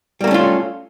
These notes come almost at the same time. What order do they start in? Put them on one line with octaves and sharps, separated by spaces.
G3 A#3 A3 C#4 F4